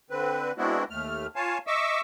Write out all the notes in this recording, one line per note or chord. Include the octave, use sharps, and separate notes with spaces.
D3 C4 B4
G#3 B3 C4 D4 E4 F#4
D#2 A3 F6
F4 C#5 F5 G#5 A5
D#5 E5 C#6 D6 E6